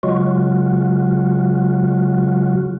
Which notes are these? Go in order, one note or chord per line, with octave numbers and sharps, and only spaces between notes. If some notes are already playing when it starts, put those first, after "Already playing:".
C#3 F#3 G#3 F4 F#4